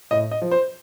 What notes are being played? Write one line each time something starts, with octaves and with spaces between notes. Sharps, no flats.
A2 D#5
D#5
F3
C5